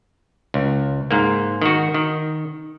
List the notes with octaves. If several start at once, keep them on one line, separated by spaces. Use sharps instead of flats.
C#2
G#2 A#3
D#3 F#4
D#3